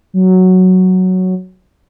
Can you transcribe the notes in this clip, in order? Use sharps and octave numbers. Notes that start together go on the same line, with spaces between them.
F#3